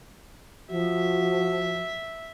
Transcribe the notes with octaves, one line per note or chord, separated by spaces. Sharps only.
F3 F#4 E5